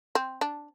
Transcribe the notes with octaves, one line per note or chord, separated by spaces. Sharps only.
C4
D4